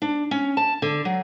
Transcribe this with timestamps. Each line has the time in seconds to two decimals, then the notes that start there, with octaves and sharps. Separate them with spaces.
0.02 D4
0.31 C#4
0.57 A5
0.82 D3
1.05 F#3